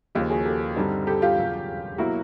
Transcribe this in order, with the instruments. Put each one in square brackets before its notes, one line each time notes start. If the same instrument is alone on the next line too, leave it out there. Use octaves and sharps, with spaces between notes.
[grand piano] D#2 C#3 F3 [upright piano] F4 G4
[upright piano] F#4 G#4
G4 A4
[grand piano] G2 D3 G3 C4 D#4
[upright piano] G4 A4
F4 G4
[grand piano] E1 E2 C#3 F#3
[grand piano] B2 F#3 A#3 [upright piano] E4 F#4